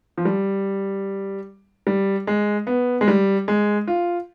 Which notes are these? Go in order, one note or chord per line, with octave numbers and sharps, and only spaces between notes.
F3
G3
G3
G#3
B3
G#3
G3
G#3
F4